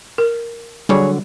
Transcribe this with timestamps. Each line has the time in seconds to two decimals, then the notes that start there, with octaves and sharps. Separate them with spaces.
0.18 A#4
0.89 D3 F#3 G3 G#4 C#5